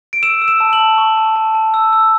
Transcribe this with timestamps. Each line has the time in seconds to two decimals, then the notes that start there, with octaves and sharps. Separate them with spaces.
0.13 D7
0.23 E6 E7
0.42 E6
0.48 E7
0.60 A5
0.73 F#7
0.80 A5
0.98 C#6
1.17 A5
1.36 A5
1.55 A5
1.74 E6
1.93 E6